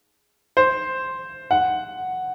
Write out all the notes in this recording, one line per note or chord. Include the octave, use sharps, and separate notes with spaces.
C5
F#5